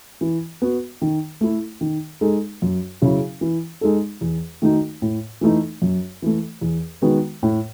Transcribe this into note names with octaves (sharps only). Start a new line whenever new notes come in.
E3
B3 F#4
D#3
A3 E4
D#3
G#3 D#4 A4
F#2
C#3 F#3 C#4 E4
E3
G#3 D#4 A4
E2
D#3 A3 D#4 F#4
A2
E3 A3 D#4
F#2
E3 A3
E2
D#3 G#3 B3 F#4
A2